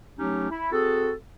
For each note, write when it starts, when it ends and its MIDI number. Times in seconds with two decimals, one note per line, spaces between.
0.18 0.48 54
0.18 0.48 57
0.18 0.48 61
0.18 0.48 63
0.18 0.48 67
0.50 0.71 64
0.72 1.13 60
0.72 1.13 66
0.72 1.13 68
0.72 1.13 69